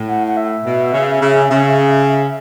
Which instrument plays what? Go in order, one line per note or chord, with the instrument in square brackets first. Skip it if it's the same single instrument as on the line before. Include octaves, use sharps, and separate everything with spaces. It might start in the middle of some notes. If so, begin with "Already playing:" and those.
Already playing: [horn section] A2
[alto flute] F#5
F#5
E5
[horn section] B2
C#3
C#3
C#3